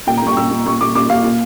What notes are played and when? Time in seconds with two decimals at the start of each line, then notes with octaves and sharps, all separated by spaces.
0.07 A#2 G5
0.17 A#5
0.22 A#2 C#6
0.37 A#2 E6
0.51 A#2
0.66 A#2 C#6
0.81 A#2 D6
0.95 A#2 D6
1.09 A#2 F5
1.24 A#2